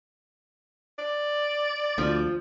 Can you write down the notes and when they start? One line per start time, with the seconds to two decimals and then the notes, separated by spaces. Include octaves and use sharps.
0.98 D5
1.98 D2 F3